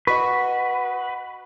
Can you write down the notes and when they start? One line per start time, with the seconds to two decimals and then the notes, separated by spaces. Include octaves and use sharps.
0.07 F#4 B4 D#5 C#6